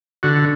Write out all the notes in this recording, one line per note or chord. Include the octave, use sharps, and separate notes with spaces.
D3 F#4